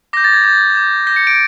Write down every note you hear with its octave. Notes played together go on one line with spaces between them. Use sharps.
D6 G6 A#6
A6
G#6
D6 G6 A6
D6 G6
D6 G6 A#6
C#7
D7